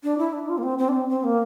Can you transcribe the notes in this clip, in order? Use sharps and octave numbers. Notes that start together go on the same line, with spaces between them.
D4
E4
D4
F4
A#3
C4
C4
D4
C4
C4
A#3